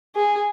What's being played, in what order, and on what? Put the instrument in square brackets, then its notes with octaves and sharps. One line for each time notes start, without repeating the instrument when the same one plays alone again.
[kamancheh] G#4